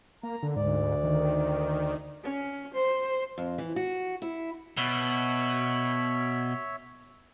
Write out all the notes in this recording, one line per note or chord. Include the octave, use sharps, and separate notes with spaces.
A#3 A#5
D3
D2 G#2 D5
D#3
C#4
C5
F2
E3
F#4
E4
B2 C#5 E5